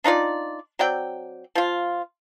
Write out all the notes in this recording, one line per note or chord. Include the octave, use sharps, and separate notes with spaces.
D4 D#4 F4 D5
F#3 C4 D5 G5
F3 F4